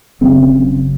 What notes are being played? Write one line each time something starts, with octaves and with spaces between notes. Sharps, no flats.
F#1 F#2 C#3 C4